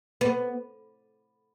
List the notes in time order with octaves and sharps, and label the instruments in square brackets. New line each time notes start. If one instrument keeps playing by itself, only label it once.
[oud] B3